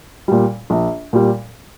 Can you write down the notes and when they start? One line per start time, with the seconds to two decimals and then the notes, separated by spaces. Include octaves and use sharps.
0.28 A#2 G3
0.70 A#1
1.13 A#2 G3